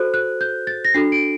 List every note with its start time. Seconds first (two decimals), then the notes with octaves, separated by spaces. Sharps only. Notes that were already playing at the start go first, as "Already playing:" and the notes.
Already playing: F#4 A4 C5 F#6
0.14 F#6
0.41 G6
0.67 A6
0.85 A#6
0.94 D4 F#4 A4 C7
1.12 D7